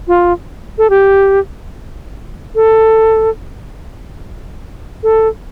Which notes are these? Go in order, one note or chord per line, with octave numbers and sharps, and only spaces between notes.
F4
A4
G4
A4
A4